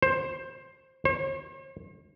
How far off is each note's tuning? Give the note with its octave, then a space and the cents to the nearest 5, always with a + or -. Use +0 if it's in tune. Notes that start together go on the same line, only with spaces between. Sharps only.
C5 +15
C5 +45